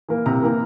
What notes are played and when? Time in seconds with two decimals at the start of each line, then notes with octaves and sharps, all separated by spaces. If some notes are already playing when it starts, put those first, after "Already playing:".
0.09 E3 A#3
0.26 C3 A#5
0.43 E3 A#3